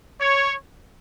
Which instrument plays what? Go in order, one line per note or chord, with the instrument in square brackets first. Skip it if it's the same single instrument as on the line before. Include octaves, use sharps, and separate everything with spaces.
[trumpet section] C#5